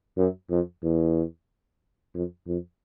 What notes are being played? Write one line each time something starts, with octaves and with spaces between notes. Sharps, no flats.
F#2
F2
E2
F2
F2